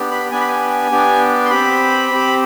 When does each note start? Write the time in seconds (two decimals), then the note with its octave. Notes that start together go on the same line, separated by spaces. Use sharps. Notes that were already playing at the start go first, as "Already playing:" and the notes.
Already playing: B3 D4 G4
0.11 B5
0.31 B3 D4 G4 G#5
0.40 B5
0.48 G#5
0.91 B3 D4 G4
1.45 C6
1.50 C4 G4 B5
2.11 C4 G4